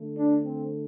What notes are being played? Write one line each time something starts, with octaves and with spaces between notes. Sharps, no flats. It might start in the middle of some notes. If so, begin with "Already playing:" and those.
Already playing: D3 A3
D4
C4